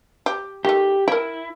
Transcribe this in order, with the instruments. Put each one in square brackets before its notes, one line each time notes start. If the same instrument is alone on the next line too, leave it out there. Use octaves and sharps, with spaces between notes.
[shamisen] G4
[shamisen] D#3 A3 [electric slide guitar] G4
[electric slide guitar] E4 [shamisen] A#4 G5